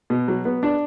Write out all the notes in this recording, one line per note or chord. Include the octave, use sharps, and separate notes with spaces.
B2
F#3
B3
D4